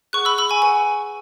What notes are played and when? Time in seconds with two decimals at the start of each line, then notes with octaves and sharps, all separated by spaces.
0.13 G#4 B4 F#5 C#6 F#6
0.25 B5 E6
0.38 B5 E6
0.50 G#5 C#6
0.62 G#4 B4 F#5 G#5